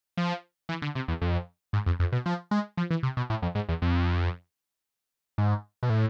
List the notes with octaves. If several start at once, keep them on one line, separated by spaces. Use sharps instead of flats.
F3
E3
D3
C3
E2
F2
G#2
F2
F2
B2
F3
G#3
F3
E3
C3
B2
A2
F2
G#2
E2
F2
G#2
B2
A2